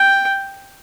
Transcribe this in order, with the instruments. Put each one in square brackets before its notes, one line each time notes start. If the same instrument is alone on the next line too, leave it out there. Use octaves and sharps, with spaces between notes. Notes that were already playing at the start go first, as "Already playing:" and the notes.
Already playing: [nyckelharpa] G5